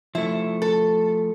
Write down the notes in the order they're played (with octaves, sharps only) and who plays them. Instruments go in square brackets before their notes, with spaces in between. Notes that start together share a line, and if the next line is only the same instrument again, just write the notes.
[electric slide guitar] F3 A3 [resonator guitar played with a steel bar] E4
[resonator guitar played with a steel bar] A4